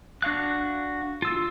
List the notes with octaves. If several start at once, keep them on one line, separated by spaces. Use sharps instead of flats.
D4 F#4 F5 F#6
F4 E6